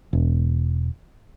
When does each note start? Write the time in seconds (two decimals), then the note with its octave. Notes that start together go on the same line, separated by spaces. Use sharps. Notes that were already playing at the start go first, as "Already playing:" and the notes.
0.13 E1